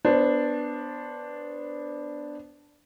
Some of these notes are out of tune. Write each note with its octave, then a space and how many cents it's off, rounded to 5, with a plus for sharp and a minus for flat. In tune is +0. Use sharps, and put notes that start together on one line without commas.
B3 +0 D4 +0 C5 +20